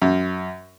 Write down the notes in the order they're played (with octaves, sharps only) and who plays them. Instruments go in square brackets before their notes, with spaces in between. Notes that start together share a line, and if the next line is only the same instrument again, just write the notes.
[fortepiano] F#2